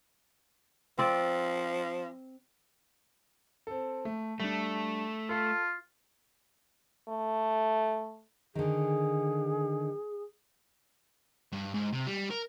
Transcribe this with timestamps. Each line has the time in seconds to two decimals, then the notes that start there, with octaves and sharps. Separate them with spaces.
0.98 F3 C4 D5
3.67 C4 A4
4.05 A3
4.40 G3 A3 D4
5.29 F4 A4
7.08 A3
8.55 D3 D#3 G#4
11.52 G2
11.74 G#2
11.92 C3
12.06 G3
12.30 A#4